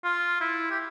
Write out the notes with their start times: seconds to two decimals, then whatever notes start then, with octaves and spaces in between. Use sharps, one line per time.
0.04 F4
0.41 E4
0.71 G4